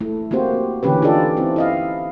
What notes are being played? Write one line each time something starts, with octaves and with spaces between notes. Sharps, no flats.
A3 E4
A#3 C4 F#4 G4 C5
D3 E3 C#4 G4 B4
D#4 F4 G4 A4 D5
C4 E4
E4 D#5 F5